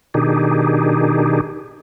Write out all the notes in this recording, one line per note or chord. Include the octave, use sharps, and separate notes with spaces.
B2 D#3 D4 D#4 G4 G#4